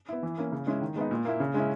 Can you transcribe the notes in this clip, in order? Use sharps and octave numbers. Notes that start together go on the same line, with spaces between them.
B3 E4
E3
A#3 C#4
C#3
G#3 C#4 E4
D#3
G#3 B3 D#4
A#2
A#3 E4
C#3
G#3 C#4 E4